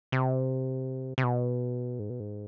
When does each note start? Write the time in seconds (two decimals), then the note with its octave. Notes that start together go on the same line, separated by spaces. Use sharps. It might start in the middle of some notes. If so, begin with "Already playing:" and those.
0.12 C3
1.18 C3
1.24 B2
1.99 G#2
2.10 B2
2.20 G#2